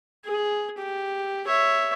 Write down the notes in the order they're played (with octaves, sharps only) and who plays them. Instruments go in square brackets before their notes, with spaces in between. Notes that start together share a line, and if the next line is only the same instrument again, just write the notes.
[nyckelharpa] G#4
G4
C#5 E5